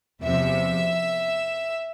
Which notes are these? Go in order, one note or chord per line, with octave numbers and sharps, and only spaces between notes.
E2 C3 F3 E5